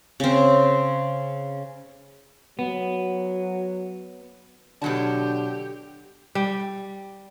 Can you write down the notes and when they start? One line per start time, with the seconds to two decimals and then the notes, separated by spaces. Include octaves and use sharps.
0.20 C#3 C4
2.59 F#3 B3
4.82 B2 D3 F#3 G4 A5
6.35 G3